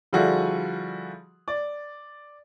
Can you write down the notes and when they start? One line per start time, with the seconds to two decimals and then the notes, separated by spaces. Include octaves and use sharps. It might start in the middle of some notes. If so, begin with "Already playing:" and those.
0.13 D3 F3 G3 E4 F#4 G#4
1.48 D5